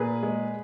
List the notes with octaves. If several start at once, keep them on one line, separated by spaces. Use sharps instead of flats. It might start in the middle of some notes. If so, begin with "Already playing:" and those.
Already playing: A#2 G#4 B4
G#3